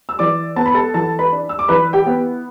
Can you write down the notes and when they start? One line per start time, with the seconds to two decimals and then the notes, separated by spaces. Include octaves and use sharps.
0.09 E6
0.19 E3 D5 D6
0.56 B3 A5
0.66 B5
0.74 A4 A5
0.94 E3 A4 A5
1.19 B4 B5
1.32 D4
1.49 E6
1.59 D6
1.68 E3 B4 B5
1.93 G4 G5
2.06 B3